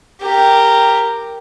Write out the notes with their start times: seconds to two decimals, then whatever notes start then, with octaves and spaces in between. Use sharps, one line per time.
0.22 G4 A#4